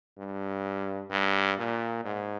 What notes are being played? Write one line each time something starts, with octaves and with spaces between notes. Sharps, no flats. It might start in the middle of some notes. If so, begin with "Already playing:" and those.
G2
G2
A#2
G#2